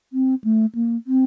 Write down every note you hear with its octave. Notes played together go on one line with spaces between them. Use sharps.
C4
A3
A#3
C4